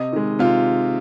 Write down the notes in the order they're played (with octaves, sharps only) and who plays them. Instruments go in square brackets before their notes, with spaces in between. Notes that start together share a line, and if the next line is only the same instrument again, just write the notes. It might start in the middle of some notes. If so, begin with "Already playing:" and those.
Already playing: [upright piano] C3 D#5
D#3 G#3
C3 F4